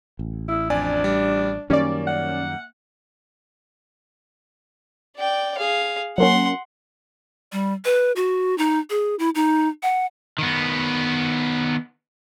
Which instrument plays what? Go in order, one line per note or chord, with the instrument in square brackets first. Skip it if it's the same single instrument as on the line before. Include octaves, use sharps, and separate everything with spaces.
[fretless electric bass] A1
[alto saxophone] E4
[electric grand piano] F2 D5 G#5 [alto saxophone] D4
[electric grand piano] G3
[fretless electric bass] F#2 D#3 G3 [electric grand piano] A#3 [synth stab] C#4 D5
[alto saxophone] F#5
[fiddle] D5 G5
G#4 F5
[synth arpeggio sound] F#3 A#3 C#4 [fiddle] F#5 C6
[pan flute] G3
B4
F#4
D#4
G#4
E4
D#4
F#5
[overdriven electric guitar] D#3 B3